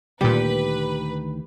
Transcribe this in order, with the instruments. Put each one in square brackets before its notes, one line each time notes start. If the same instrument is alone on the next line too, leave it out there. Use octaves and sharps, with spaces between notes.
[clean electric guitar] D2 D#3 [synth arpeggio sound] A#2 G3 [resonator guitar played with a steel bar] G4 [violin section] B4